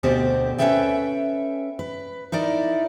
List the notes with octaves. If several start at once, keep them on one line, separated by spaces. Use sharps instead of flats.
D2 B2 D3 C4 G4 C5
C#4 E4 A4 B4 E5 G5
B4
D#4 E4 A#4 D5